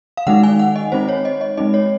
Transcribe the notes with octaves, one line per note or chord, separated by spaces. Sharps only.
F5
D#3 G#3 D#4 F#5
G#5
F#5
D#5
G#3 C4 D#4 C5
C#5
D#5
D#5
G#3 C4 D#4 D#5
C#5